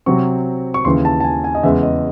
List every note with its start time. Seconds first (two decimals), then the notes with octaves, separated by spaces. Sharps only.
0.06 C3 F#3 C4 C#6
0.74 C#6
0.85 D#2 C#3 E3 C6
1.05 A5
1.20 A5
1.24 G#5
1.44 G#5
1.55 D#5
1.63 E2 C#3 G#3 E5
1.83 D#5